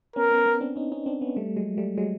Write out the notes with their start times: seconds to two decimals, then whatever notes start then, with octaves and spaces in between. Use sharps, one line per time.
0.16 B3 C#4 A#4
0.31 B3 C#4
0.46 B3 C#4
0.61 C4 D4
0.76 C#4 D#4
0.92 C#4 D#4
1.06 C4 D4
1.21 B3 C#4
1.36 G3 A3
1.57 F#3 G#3
1.78 G3 A3
1.98 F#3 G#3